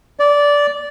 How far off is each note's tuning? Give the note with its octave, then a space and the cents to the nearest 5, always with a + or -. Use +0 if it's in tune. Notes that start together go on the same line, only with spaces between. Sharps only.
D5 -15